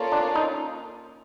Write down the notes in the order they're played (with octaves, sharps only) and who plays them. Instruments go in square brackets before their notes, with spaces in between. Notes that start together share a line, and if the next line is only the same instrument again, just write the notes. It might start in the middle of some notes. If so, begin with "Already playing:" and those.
Already playing: [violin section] A#3 C#4 F4 A4 D5
[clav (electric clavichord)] D4
D#4